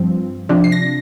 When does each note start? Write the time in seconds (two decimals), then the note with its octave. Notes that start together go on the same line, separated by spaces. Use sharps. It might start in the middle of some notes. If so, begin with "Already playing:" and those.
Already playing: G2 F3 C4
0.49 C3 F3 D4
0.64 C7
0.72 A#6